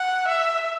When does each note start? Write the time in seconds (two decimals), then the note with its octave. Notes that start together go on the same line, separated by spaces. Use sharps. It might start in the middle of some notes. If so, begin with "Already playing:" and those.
Already playing: F#5
0.28 E5